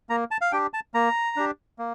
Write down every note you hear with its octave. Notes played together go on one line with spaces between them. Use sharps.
A#3 A#5
A5
F5
D4 G4 G5
A5
A#3 A#5
D4 G4
A#3